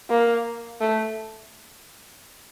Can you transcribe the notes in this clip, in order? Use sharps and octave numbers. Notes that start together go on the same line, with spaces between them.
A#3
A3